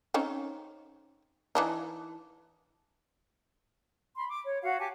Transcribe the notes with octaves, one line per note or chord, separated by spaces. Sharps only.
C4 C#4 D#4
E3 D4 D#4
B5 C6
D6
C#5
F#4 F5 F#5
G4 G#5 A5 D6